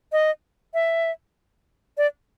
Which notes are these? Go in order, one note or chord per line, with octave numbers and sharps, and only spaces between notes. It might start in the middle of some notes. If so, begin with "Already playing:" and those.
D#5
E5
D5